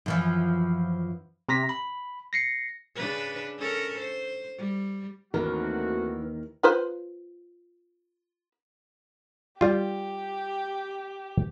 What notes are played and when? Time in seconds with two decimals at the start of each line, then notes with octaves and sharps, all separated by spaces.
0.06 F#2 E3 F3
1.49 C3 A#5 A#6 B6
1.69 B5
2.33 A#6 C7 C#7
2.95 C#3 D4 B4
3.58 C#4 A4 A#4
3.99 C5
4.58 G3
5.34 D#2 D#3 E3 A3 C4 F#4 A#4
6.63 F4 B4 C5
9.61 G3 F4 G4